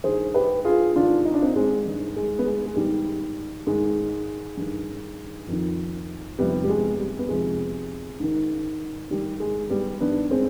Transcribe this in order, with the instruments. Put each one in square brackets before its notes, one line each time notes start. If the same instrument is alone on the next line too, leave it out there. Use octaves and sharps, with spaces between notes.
[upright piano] G2 D#3 G#4 C5
G4 B4
F4 G#4
G#2 D#3 D4 F4
D#4
D4
C4 D#4
G#3 C4
G2 D#3
G#3
B3
G#3
G#3
G#2 D#3 G3
G#2 D#3 G#3
G2 D#3
F2 D#3
F2 C3 D#3 G3 B3
G3
G#3
G3
B3
F2 C3 D#3 G#3
G#2 D#3
G#2 D#3 G3
G#3
G3 B3
G2 D#3 B3 D4
G#3 C4